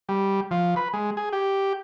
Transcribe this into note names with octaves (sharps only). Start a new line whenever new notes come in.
G3
F3
B4
G#3
G#4
G4